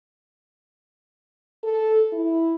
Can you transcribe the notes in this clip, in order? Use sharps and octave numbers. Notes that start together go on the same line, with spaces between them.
A4
E4